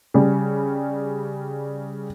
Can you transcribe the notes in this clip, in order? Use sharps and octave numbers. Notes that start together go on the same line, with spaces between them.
C#3 G3